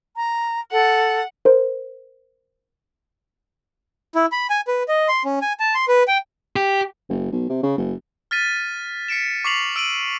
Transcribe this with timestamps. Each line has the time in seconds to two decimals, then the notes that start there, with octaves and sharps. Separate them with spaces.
0.16 A#5
0.72 A4 F#5
1.45 A#4 C5
4.15 E4
4.32 B5
4.50 G#5
4.67 B4
4.88 D#5
5.08 C6
5.25 C#4
5.42 G#5
5.60 A5
5.75 C6
5.88 B4
6.08 G5
6.56 G4
7.09 F#1
7.32 B1
7.49 C3
7.63 C#3
7.78 F#1
8.31 F6 A6 B6 D#7
9.08 B6 C#7 D7 E7
9.44 C#6 D6 B6 C7 F7 F#7
9.76 E6 D7 D#7 F#7